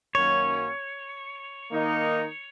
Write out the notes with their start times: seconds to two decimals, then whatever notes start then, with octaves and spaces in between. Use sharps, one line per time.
0.15 F#2 D#3 F#3 A#3 C#4 C#5
1.71 D#3 A#3 D#4